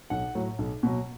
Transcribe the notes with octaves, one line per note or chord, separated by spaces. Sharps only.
B1 F#5
A2 F#3
B1
B2 F#3